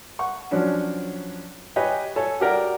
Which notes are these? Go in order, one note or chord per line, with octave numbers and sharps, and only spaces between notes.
F#5 C#6
F3 F#3 C#4 D4
G4 B4 C#5 D#5 G5 G#5
A4 C#5 G#5
F#4 G4 A#4 D5 F#5